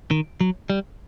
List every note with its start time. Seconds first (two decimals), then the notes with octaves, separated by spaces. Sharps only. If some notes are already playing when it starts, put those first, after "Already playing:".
0.11 D#3
0.41 F#3
0.70 G3